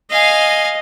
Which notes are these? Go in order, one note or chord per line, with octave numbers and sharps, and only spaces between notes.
D#5 F5 G#5